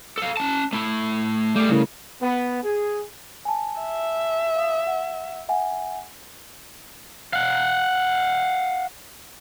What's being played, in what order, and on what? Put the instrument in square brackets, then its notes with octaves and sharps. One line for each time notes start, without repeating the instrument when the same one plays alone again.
[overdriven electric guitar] A4 F5
C#4 A5
A3 E4
[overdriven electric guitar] G3 G#4 [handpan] A3
[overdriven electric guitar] C#3 [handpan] G3 E4 A#4
[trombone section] B3
G#4
[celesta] G#5 A5
[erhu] E5
[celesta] F5 D#6
F#5
E5 F#5 G#5
[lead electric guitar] F5 F#5